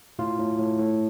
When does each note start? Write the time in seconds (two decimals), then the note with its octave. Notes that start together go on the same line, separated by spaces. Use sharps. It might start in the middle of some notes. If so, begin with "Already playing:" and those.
0.19 A2 F4
0.39 A2
0.59 A2
0.79 A2